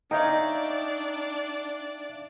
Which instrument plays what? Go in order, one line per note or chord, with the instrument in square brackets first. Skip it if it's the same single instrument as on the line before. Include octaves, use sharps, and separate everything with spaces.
[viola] D4 D5 [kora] D#4 C#5 [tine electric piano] E5 F5 G5